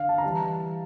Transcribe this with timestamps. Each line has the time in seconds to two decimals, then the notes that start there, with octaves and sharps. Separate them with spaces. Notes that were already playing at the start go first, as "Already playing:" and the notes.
Already playing: D3 F5
0.09 A5
0.18 A#5
0.23 E3 G3 A5